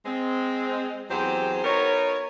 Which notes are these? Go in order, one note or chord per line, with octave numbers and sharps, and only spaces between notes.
G#3 C4
E2 F#3 C4 G4 G#4 C5
B3 D#4 F#4 A#4 C#5